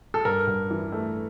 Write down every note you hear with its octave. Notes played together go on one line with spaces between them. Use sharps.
A4
G2 A#4
G2
E3
A3